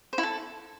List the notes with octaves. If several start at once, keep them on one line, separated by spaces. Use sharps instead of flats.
C5
E4
A4